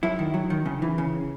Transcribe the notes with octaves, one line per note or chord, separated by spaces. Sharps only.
F#2 E4
D#3
F#3
D#3
C#3
E3
C#3